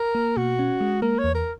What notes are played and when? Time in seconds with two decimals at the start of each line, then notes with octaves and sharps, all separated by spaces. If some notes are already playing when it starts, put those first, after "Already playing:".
Already playing: A#4
0.15 A#3
0.37 B2 F#4
0.59 C#4
0.81 G#3
1.02 A#3 A#4
1.19 C#5
1.24 E2
1.35 A#4